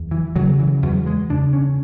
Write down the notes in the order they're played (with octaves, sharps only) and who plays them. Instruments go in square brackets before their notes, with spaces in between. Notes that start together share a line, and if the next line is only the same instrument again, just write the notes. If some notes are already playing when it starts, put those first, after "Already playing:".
Already playing: [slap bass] E2
E3
C#3 F#3
E3
E2 F#3
G#3
C#3 D4
C#4